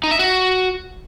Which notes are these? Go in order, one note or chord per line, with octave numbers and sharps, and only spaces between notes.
D#4
E5
F#4